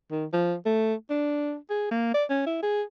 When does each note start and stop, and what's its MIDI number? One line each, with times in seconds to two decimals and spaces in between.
0.11 0.26 51
0.33 0.55 53
0.66 0.94 57
1.10 1.56 62
1.70 1.91 68
1.91 2.14 58
2.14 2.25 74
2.30 2.46 61
2.47 2.62 64
2.63 2.82 68